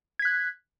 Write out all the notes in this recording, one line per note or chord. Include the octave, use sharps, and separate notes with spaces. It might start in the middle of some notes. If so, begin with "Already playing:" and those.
F#6 G#6 B6